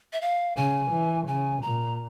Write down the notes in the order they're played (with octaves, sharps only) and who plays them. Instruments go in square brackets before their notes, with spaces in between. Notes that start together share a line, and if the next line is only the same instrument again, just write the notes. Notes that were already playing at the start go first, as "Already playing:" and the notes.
[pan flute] E5
F5
[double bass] C#3 [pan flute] G#5
[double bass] E3
[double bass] C#3 [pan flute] G#5
[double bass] A#2 [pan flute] A#5